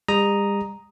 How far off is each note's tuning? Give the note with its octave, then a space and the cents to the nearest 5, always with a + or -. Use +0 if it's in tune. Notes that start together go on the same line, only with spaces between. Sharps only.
G3 +45 A#5 +0 D#6 +0